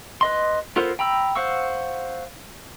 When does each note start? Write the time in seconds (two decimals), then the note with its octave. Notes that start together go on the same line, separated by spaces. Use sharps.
0.21 B4 D#5 C6
0.76 B3 F4 A4 A#4 C5
0.99 G5 A#5 B5 E6
1.35 C5 F5 F#5 C#6 E6